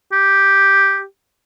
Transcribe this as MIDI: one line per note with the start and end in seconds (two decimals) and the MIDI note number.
0.12 1.04 67